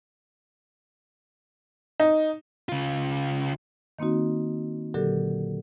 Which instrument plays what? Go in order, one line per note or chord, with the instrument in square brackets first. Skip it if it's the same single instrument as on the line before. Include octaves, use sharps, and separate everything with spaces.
[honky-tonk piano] D#4
[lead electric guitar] C#3 F4
[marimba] D#3 A#3 C4 D#4 F#4
A#2 D3 F#3 G4 A4 A#4